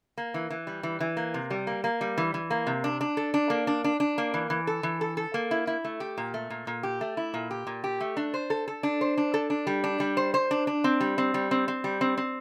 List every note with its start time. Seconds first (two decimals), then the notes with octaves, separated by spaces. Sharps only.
0.18 A#3
0.34 E3
0.50 E3
0.67 G3
0.83 E3
1.00 E3
1.17 A#3
1.34 C3
1.51 G3
1.67 A#3
1.84 A#3
2.01 G3
2.18 E3
2.34 E3
2.51 A#3
2.67 C3
2.84 D4
3.01 D4
3.17 A4
3.34 D4
3.50 A#3
3.67 D4
3.84 D4
4.00 D4
4.18 A#3
4.34 E3
4.50 E3
4.67 A4
4.83 E3
5.01 A4
5.17 A4
5.34 A#3
5.51 E4
5.67 E4
5.85 A3
6.00 G4
6.18 A#2
6.34 A3
6.50 A#2
6.67 A#2
6.83 G4
7.01 A3
7.17 E4
7.34 A#2
7.51 G4
7.67 A#2
7.84 G4
8.01 A3
8.17 D4
8.34 C5
8.50 A4
8.68 A4
8.83 D4
9.01 C5
9.18 D4
9.34 A4
9.50 D4
9.67 G3
9.84 D4
10.00 G3
10.17 C5
10.34 C5
10.51 D4
10.67 D4
10.84 C4
11.01 G3
11.18 C4
11.34 G3
11.51 C4
11.68 C4
11.84 G3
12.01 C4
12.17 C4